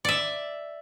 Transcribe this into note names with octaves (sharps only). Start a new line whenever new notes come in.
D5 E5